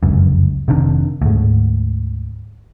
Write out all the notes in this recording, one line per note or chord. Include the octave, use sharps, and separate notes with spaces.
F1 C#2 F#2
F1 C3 D#3 D4
D2 G#2